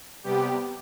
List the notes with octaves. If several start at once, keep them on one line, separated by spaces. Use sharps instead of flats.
C3 G3 B3 G4